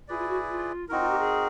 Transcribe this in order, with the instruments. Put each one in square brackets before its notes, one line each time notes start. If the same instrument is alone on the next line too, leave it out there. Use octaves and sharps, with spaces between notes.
[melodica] E4 G#4 B4 D5 [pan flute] F4
[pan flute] F4
F#4
F4
[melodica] C4 D#4 F#4 A#4 [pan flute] E4
[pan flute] F4
G4
G#4